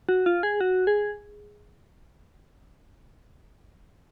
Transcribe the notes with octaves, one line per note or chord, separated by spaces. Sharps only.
F#4
F4
G#4
F#4
G#4